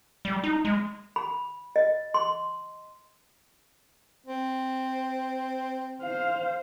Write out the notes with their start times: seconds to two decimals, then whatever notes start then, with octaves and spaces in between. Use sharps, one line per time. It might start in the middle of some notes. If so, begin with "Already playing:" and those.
0.25 G3
0.44 D#4
0.65 G#3
1.16 B5
1.76 D#5
2.14 C6
4.26 C4
6.02 C5 F5